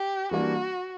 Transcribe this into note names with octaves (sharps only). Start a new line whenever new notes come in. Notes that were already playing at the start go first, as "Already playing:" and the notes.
Already playing: G4
E3 G3 A#3 D4 F#4